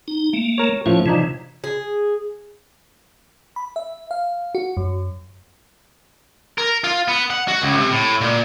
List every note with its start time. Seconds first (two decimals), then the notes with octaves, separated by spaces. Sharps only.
0.08 D#4
0.33 A3 A#3
0.58 A#4 C#5
0.86 A2 F3 A3 C#4
1.06 C3 E3 F3 D4 D#4
1.64 G#4
3.56 B5
3.76 E5
4.11 F5
4.55 F#4
4.77 F#2
6.58 A#4
6.84 F4
7.08 B3
7.30 F#5
7.48 F#4
7.62 C#2
7.77 C3
7.91 A2
8.21 A#2